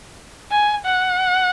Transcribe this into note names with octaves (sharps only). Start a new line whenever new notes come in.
G#5
F#5